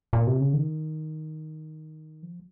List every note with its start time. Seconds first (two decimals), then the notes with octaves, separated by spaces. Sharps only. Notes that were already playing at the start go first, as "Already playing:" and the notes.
0.13 A#2
0.27 C3
0.40 C#3
0.53 D#3
2.22 F3